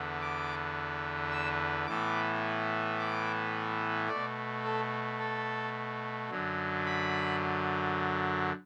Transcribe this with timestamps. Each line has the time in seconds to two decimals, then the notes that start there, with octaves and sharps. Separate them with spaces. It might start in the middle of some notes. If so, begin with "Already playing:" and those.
Already playing: E2 D3 B3
0.21 D6
1.32 E6
1.87 A2 E3 B3 D6
2.99 D6
4.08 B2 A3 D5
4.64 A4
5.19 A4
6.30 F#2 D3 F#3
6.86 B5